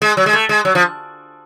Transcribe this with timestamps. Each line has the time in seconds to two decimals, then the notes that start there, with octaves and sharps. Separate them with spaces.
0.02 G#3
0.17 F#3
0.26 G#3
0.33 A3
0.49 G#3
0.65 F#3
0.75 F3